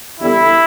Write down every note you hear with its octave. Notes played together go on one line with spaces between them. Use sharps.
E2 D3 G3 E4